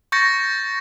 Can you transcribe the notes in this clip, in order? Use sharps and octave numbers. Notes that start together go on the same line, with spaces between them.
C#6 G6 A6 A#6 C#7